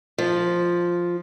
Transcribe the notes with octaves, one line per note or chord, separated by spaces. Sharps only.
F3